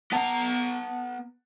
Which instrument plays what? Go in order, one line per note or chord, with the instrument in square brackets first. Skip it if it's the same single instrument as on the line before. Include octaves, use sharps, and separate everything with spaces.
[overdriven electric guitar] B3 A#5 [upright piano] F#5 A5